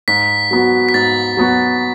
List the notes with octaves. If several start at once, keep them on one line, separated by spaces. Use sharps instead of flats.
G#2 B6
F#3 B3 F#4
B6
G#2 A6
F#3 B3 F#4